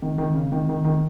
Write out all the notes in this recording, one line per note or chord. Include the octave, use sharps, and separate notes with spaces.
D#3
D#3
C#3
D#3
D#3
D#3